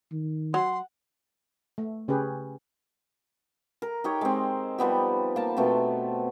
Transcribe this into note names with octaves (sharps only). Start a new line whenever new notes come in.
D#3
F#3 F#5 C6
A3
C#3 C#4 G4 G#4 B4
A#4
D#4 G4 C#5
G#3 C4
F3 G3 B3 G4
A#3 A5
B2 A3 B3 C4